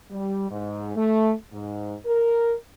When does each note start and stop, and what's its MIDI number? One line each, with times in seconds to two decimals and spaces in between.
0.11 0.49 55
0.50 0.91 44
0.96 1.32 57
1.53 1.95 44
2.05 2.53 70